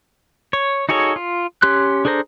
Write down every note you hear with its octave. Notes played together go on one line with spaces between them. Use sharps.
C#5
D#4 F#4 G#4 A4 C#5
F4
C#4 G4 C6 F#6
D4 G#4 A4 C5 A#5